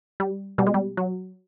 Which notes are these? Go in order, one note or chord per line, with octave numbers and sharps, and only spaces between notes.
G3
B2 G3
G#3
G3
F#3